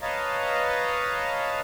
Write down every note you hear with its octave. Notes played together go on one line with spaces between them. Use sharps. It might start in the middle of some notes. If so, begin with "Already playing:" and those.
B4 C#5 D#5 F5 A5 A#5